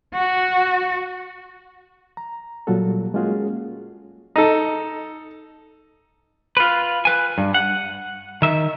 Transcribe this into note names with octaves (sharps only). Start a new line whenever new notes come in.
F#4
A#5
A#2 F#3 G3 F4 F#4 A4
G#3 A#3 C#4 F4 F#4 G#4
D#4 A4
F4 B4
B4 G#5
G2
F#5
D#3 E5